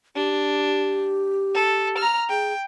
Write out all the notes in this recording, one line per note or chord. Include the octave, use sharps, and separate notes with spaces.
D4 G4
A4
A#5 F6
G#4 G5